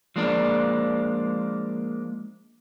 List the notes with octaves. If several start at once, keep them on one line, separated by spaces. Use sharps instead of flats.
F3 G#3 A#3 D4